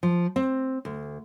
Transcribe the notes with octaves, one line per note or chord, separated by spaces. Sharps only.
F3
C4
D2